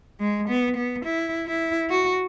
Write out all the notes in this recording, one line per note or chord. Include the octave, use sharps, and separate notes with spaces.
G#3
B3
B3
E4
E4
F#4